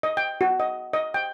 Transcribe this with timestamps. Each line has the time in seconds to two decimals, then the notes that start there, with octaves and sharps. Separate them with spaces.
0.03 D#5
0.17 G5
0.41 F#4
0.60 D#5
0.93 D#5
1.14 G5